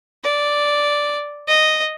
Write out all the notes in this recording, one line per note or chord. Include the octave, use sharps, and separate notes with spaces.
D5
D#5